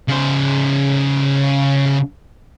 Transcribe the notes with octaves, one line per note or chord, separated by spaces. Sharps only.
C#3 C5